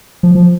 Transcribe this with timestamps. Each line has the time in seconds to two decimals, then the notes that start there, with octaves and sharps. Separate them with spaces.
0.23 F3
0.35 F3